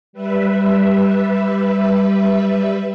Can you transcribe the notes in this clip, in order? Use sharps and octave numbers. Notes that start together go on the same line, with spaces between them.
G3 B4 E5